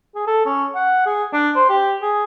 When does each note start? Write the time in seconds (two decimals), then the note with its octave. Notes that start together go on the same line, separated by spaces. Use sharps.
0.15 G#4
0.27 A4
0.46 C#4
0.75 F#5
1.06 G#4
1.33 D4
1.56 C5
1.69 G4
2.02 G#4